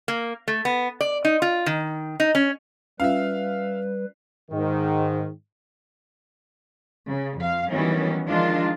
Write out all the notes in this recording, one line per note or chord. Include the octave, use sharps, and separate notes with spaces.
A#3
A3
B3
D5
D#4
F4
D#3
D#4
C#4
G3 C#4 F4 B4 E5 F5
G#2 D#3
C#3
F2 F5
D#3 E3 F#3 G3 B3 C#4
D#3 F3 G#3 D4 D#4 F4